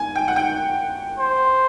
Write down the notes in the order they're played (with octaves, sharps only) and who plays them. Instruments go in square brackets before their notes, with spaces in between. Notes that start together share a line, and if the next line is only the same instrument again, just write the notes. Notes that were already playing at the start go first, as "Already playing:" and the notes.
Already playing: [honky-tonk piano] G#5
G5
F#5
G5
[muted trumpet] C5